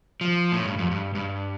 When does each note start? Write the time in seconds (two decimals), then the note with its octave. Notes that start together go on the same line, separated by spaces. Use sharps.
0.21 F3
0.52 A2
0.65 G2
0.78 F2
0.91 G2
1.15 G2